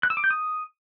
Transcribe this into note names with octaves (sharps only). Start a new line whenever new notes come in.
F#6
E6
D6
G6
D#6